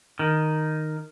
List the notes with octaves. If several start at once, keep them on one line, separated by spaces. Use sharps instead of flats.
D#3